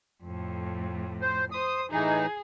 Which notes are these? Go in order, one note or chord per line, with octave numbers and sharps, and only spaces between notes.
F2 A2
C5
C5 D#6
A2 E3 D#4 G#4